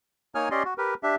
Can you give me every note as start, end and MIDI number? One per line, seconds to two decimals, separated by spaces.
0.35 0.49 58
0.35 0.49 63
0.35 0.49 73
0.35 0.49 80
0.35 0.49 87
0.35 0.49 89
0.51 0.63 61
0.51 0.63 67
0.51 0.63 74
0.51 0.63 75
0.51 0.63 84
0.65 0.74 66
0.78 0.94 67
0.78 0.94 70
0.78 0.94 71
1.03 1.16 62
1.03 1.16 67
1.03 1.16 76